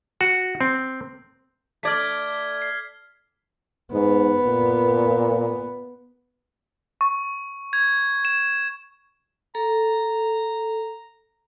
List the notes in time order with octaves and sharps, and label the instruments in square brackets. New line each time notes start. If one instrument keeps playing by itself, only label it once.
[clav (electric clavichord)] F#4
C4
[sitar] A3 D5 [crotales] F6 G#6 B6
[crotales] C7
[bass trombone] G#2 [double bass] B3
[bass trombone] A#2
[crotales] C#6
G#6
E7
[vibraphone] A4 [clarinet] A#5